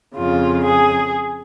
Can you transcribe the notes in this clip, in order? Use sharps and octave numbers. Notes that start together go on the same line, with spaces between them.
F2 C#3 F4
G#4